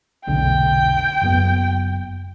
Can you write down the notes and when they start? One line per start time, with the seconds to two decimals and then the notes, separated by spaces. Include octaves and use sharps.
0.27 F1 B1 D3 G5
1.22 F#1 F#2 B3